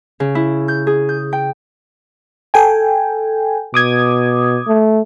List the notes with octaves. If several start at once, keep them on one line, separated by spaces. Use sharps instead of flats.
C#3
E4
G6
G#4
G6
G5
A4 G5 G#5
B2 D6 D#6 G#6
A3